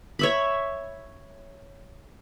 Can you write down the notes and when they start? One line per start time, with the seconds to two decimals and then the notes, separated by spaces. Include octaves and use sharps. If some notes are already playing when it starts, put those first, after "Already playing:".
0.19 C#5 E5 B5